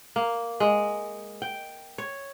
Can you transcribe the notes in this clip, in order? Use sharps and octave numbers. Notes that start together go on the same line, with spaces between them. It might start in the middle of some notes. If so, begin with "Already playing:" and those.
A#3
G#3
G5
C#5